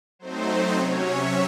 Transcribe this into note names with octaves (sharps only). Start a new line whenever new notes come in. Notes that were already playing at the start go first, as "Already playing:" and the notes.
F#3 A3 C4 D#4 C5
C5
C3 F#3 C#4 C#5
E5